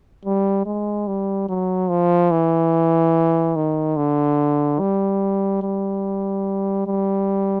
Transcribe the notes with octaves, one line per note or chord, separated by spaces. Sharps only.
G3
G#3
G3
F#3
F3
E3
D#3
D3
G3
G3
G3